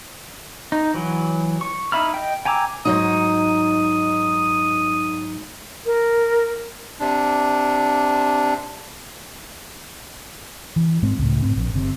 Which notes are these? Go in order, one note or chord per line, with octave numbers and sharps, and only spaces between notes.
D#4
E3 F#3
C#6
D#4 E4 E5 B5 F6
D#5 G5
G5 G#5 A#5 D6 E6
G#2 F#3 D#4 D#6
A#4
C3 D4
E3
G#2 G#3 C4
C#2 A2
G#2 C4
A#1
G1 C3